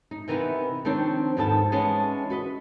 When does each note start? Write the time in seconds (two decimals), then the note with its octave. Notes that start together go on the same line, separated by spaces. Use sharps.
0.11 D#4
0.28 C3 E3 B3 D#4 A#4 B4
0.85 D#3 F3 C4 D4 C#5
1.37 D#2 G#2 F3 B3 A4 A5
1.72 E3 G#3 B3 C#4 A5
2.30 F#4 B4 D#5